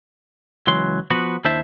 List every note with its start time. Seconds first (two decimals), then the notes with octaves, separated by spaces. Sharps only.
0.67 C#2 E3 F#3 C6
1.10 F3 B3 F#4 B4
1.45 D#2 D4 E4 C5 E5 A5